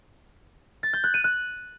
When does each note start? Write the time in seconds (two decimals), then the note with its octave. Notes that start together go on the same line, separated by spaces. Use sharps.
0.83 A6
0.93 G6
1.04 F#6
1.14 D#7
1.24 F#6